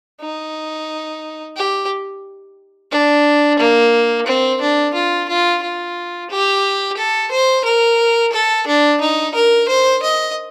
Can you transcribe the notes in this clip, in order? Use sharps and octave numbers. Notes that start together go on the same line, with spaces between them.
D#4
G4
D4
A#3
C4
D4
F4
F4
F4
G4
A4
C5
A#4
A4
D4
D#4
A#4
C5
D#5